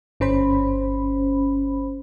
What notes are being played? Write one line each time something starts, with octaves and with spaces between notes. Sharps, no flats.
G1 C#4 C5 B5